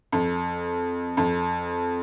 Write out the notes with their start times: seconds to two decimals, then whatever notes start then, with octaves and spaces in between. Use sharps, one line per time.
0.12 F2
1.17 F2